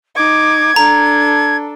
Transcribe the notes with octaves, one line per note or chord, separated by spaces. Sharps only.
D#4 D6 G#6
D4 A4 A#5